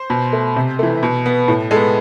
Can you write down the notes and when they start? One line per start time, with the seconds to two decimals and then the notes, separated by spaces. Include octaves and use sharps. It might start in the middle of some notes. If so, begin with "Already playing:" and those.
Already playing: C5
0.10 B2
0.33 A3
0.56 C3
0.79 E3 A3
1.03 B2
1.26 B3
1.48 A2
1.71 G#3 A4
1.76 B3